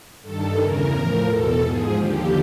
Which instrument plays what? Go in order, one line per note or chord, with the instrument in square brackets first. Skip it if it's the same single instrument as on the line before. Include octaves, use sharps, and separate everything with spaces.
[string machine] G2 D#3 A4
E2 C#3 E3 A#4
A2 F3
E2 B2 A4
G#2 F3 G#4
D#2 D3 F3 G4